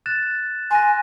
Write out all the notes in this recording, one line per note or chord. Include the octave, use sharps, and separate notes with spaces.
F#6 A6 E7
G#5 C6 F#6 A#6